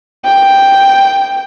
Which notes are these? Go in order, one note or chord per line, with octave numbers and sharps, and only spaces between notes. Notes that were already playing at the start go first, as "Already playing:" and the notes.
G5